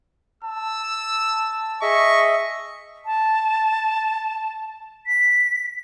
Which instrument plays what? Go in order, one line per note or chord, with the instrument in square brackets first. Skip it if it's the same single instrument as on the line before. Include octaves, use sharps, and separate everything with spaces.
[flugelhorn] A5 [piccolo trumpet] E6
[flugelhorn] G#4 [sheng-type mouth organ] D#5 E5 [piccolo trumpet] C#6
[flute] A5
B6